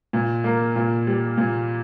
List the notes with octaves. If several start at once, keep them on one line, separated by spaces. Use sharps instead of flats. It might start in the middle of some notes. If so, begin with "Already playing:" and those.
A#2
A#3
A#2
G3
A#2